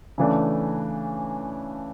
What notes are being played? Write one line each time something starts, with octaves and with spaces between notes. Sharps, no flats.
C#3 E3 A3 D4